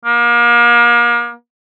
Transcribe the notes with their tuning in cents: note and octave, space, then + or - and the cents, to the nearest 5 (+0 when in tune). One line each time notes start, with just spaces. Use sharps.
A#3 +35